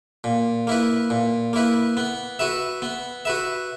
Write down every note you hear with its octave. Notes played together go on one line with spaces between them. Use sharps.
A#2
A#3 E4 B4
A#2
A#3 E4 B4
B3
F#4 B4 E5
B3
F#4 B4 E5